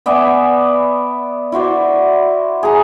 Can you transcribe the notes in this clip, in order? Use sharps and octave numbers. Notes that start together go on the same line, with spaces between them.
B3 D5 E5 G#5
E4 F#4 C5 D5
G#4 A#5